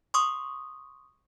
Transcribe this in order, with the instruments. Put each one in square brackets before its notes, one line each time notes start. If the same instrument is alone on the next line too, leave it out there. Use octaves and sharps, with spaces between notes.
[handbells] C6 C#6 D#6